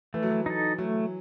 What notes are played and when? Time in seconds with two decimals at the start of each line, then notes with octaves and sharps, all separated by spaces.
0.14 E3 A3
0.23 F#3
0.30 E3
0.46 D#4 A4
0.78 F#3 A3